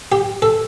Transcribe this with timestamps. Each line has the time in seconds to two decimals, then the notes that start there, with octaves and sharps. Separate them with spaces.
0.12 G4
0.42 A4